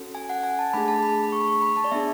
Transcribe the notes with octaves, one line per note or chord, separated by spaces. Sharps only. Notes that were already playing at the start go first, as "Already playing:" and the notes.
Already playing: C#4 F#4 A4
G#5
F#5
G#5
A5
A3 D4 G#4 B5
A5
B5
C#6
B5
C#6
B5
A5
D5
B3 D4 G#4 E5